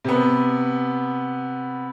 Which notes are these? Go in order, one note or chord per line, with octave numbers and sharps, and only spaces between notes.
C3 B3